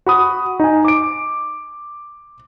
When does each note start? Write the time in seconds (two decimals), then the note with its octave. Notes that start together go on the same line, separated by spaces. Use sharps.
0.06 F#4 B5 D#6
0.60 D#4 G#5
0.85 D6 D7